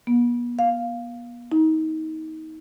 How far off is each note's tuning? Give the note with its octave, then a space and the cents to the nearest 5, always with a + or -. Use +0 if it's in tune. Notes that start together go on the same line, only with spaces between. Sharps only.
B3 -40
F5 +0
D#4 +25